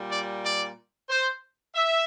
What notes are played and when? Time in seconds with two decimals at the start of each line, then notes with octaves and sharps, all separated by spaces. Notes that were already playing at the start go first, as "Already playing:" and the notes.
Already playing: A#2 G3
0.11 D5
0.44 D5
1.10 C5
1.75 E5